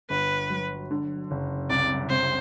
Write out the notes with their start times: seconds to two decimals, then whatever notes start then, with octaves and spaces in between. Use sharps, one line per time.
0.10 G1 B4
0.50 F#3
0.91 D3
1.31 F#1
1.70 C2 D5
2.10 C3 C5